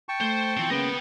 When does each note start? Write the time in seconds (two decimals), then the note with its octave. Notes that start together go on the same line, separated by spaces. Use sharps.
0.09 G5 A5 C#6
0.21 A3 C5
0.57 B2 E3 F3 C4
0.70 C#3 G#3 A#3 B3 D#5 G5